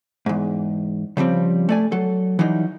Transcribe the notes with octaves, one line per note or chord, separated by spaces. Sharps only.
E2 G#2
C#3 F3 G3 C4
A3 D5 G#5
F#3 A4
E3 F#3 G3 D#4